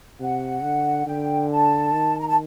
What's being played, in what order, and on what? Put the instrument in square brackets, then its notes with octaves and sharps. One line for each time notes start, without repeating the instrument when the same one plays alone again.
[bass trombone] C3 [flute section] F#5
[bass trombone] D3
[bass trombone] D3 [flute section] G5
[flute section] A5
[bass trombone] D#3
[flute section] A#5
A5